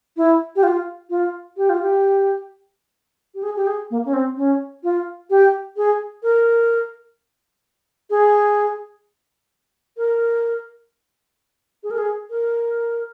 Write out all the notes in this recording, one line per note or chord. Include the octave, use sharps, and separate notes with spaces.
E4
G4
F4
F4
G4
F4
G4
G4
G#4
G4
G#4
A#3
C#4
C4
C#4
F4
G4
G#4
A#4
G#4
A#4
G#4
A#4
G#4
A#4